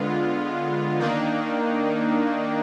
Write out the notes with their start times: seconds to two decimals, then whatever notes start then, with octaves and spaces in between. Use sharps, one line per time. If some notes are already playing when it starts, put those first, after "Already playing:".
Already playing: D3 G#3 B3 F4
0.99 D#3 A#3 D4 D#4